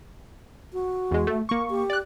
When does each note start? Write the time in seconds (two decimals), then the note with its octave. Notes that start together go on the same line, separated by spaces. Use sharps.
0.73 F#4
1.11 E2 G#3
1.27 A3
1.49 A#3 C#6
1.70 G4
1.90 D5 F#6